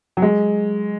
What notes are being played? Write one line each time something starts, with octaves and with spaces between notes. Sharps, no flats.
F#3
G#3